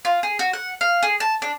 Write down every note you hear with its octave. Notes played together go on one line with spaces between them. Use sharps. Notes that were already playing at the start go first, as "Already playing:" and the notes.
F4
G#4
F#4
F#5
F5
G#4
A5
D4